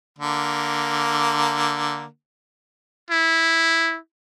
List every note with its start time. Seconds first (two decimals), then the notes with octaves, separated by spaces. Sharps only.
0.19 D3 A#3
3.10 E4